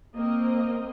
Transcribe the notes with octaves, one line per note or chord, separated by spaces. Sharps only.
A#3 C4 A#4 D#5